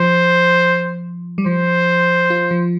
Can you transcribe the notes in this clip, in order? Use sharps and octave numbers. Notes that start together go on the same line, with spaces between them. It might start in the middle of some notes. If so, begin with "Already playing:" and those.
Already playing: F3 C5
G3
F3 C5
F4
F3